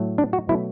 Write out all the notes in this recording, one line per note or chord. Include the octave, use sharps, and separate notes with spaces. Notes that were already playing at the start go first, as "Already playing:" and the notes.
Already playing: A2 F#3 A3
D4
F#4
B2 F#3 A3 E4